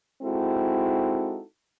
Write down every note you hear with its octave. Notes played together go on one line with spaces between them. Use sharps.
G#3 C4 D#4 E4 F#4 A4